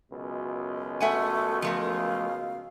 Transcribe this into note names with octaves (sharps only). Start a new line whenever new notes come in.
C#2 F#2 B2
A3 E5 F#5 G#5
F3 A3 A#4 F5